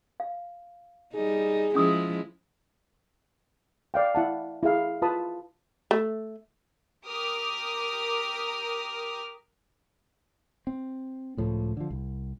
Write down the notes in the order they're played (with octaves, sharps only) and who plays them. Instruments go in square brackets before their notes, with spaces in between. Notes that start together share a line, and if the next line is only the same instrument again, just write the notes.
[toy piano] F5
[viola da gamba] G3 D#4 [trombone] G#4
[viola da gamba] F3 G#3 E4 [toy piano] C#4 D#6 E6
[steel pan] D5 F5 G5
E4 F#5 A5
E4 G#4 F5
F4 B4 A5 B5 D#6
[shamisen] A3
[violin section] G4 A#4 D6 D#6 F6
[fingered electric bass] C4
C#2 A2 F3
D3 F3
C2